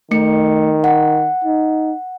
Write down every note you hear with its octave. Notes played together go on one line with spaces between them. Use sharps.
D#3 A3 C#7
F#5
D#4